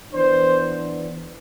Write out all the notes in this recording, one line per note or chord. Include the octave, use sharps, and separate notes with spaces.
E3 B3 D4 C5